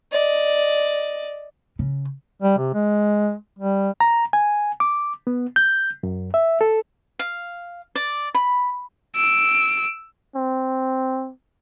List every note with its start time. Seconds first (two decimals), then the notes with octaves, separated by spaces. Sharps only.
0.12 D5 D#5
1.79 C#3
2.42 G3
2.58 C3
2.74 G#3
3.59 G3
4.00 A#5
4.33 G#5
4.80 D6
5.27 B3
5.56 G6
6.03 F#2
6.34 E5
6.61 A4
7.19 F5
7.95 D5
8.34 B5
9.16 E6 D7
10.35 C4